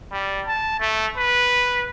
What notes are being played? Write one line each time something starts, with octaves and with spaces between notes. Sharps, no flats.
G3
A5
A3
B4